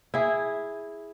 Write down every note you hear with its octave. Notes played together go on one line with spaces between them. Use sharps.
E4 G#4